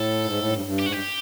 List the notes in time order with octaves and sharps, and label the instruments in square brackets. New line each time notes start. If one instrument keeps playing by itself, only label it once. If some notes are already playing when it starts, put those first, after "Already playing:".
Already playing: [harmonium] A2 [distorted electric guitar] A4
[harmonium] G#2
A2
G#2
G2
G2
[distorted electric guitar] G4
[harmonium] G#2 [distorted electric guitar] F#4
[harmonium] G2 [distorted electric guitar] G4